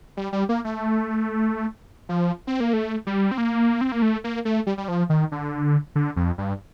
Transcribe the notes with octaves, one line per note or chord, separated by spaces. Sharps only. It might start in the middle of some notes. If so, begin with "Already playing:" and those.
G3
G3
A#3
A3
F3
C4
A#3
A3
G3
C4
A#3
C4
A#3
A3
A#3
A3
G3
G3
F3
D#3
D3
D3
F2
G2